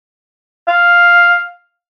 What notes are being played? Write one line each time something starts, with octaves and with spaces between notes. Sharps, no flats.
F5